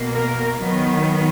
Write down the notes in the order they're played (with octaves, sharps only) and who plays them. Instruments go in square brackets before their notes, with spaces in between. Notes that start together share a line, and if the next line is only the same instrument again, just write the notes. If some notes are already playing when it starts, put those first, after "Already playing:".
Already playing: [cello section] B2 A#3
A#4
D#3 F#3 B3